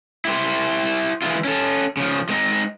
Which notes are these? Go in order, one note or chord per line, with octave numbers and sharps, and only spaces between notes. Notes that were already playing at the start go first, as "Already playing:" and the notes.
E4 G4 C5
E3 G#3 B3 E4 F4
C#4 A4
C#3 F3
G#3 C4 D#4